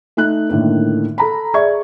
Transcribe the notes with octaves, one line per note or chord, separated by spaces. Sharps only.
A3 D#4 F#6
A2 D3 D#3 A#3
A4 A#5 B5
G#4 D5 E5 C#6 G#6